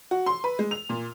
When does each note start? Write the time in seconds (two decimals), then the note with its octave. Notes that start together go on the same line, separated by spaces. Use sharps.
0.11 F#4
0.26 C6
0.44 B4
0.59 G#3
0.71 F7
0.89 A#2